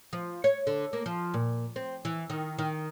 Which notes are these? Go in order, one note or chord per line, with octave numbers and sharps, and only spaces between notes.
F3
C#5
D3
A#3
F3
A#2
C4
E3
D#3
D#3